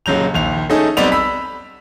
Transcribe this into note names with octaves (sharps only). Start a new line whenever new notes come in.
D#1 C#3 F#3 G6 F7
A#1 D#2 F7
A3 C#4 D#4 G#4 A4
B1 G3 B3 C4 D5 F7
B5 E6 B6